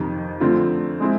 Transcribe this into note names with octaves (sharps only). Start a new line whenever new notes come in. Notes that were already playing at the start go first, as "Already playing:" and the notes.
Already playing: F2 C3 D#3
D3 F3 A3 C4 F4
G#3 C4 E4